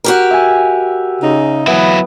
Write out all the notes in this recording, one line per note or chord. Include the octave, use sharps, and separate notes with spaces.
F#4 G4 A#4
E5 G#5
C#3 D#4
E3 F#3 B3 E4